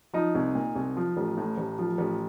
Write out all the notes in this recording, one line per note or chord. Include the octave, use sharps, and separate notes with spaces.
F3 D#4
C2
A#2
C2
F3
A1
A2
A1
F3
A1